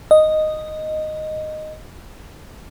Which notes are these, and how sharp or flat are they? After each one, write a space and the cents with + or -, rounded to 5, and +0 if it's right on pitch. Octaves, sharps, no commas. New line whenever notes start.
D#5 -5